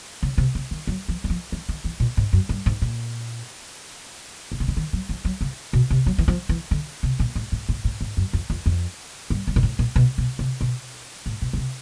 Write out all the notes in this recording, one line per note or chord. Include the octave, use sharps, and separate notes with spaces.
C#3
C3
C#3
D#3
F#3
F3
E3
F3
E3
D#3
E3
A#2
G#2
F#2
G2
G#2
A#2
C3
C#3
D3
D#3
F#3
F3
F#3
C#3
B2
C3
F#3
E3
F3
E3
D3
C3
A#2
A2
A2
A2
A2
G#2
F#2
F2
F2
F2
G2
G2
A#2
A2
A#2
B2
B2
C3
B2
A2
B2
C#3
C3